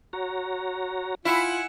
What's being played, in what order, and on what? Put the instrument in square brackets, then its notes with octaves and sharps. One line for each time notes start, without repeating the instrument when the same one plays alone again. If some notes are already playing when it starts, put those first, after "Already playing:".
[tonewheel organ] F#4 C#5 A#5
[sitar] E4 [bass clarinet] F4 [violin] F#5 G#5